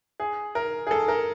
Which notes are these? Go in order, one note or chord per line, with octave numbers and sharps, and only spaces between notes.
G#4
A#4
G#4
A4
A#4